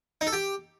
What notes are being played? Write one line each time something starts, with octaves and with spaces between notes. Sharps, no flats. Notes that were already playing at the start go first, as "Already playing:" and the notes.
D#4
A4
G4